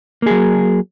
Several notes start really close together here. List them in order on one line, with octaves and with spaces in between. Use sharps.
A#3 G#4 F#3